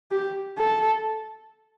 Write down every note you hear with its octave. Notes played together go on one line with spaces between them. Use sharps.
G4
A4